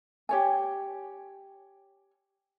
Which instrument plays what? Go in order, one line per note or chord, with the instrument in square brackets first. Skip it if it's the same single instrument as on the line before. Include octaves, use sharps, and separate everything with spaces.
[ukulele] G4 C#5 G#5